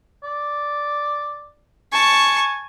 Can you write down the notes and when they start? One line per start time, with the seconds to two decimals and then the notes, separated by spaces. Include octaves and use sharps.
0.24 D5
1.93 G#5 A5 C#6